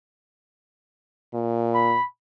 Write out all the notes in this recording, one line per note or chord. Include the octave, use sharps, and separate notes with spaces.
A#2
B5